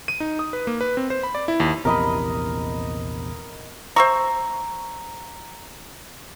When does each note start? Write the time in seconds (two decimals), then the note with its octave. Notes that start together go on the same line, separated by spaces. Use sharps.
0.08 D#7
0.20 D#4
0.39 D#6
0.53 B4
0.67 A#3
0.81 B4
0.97 C4
1.10 C5
1.23 B5
1.35 D5
1.48 E4
1.60 D#2
1.85 A#1 E2 C3 A#4 D#5 B5
3.96 C5 E5 A#5 C#6